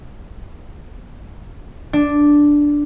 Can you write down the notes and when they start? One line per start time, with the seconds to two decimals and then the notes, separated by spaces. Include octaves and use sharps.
1.93 D4